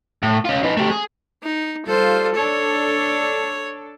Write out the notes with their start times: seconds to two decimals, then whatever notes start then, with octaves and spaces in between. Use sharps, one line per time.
0.23 A2
0.45 C#4 F4
0.63 D#4 B4
0.77 A3 G4
0.91 G#4
1.43 D#4
1.86 G3 F4 A4 C5
2.35 D4 A4 C#5